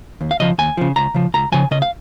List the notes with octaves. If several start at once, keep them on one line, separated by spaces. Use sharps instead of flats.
D#2
F5
C#3 F3 D#5
D#2 G#5
C#3 F3
C#2 A#5
C#3 F3
C#2 A#5
C#3 F3 G#5
C#3 D#5
F5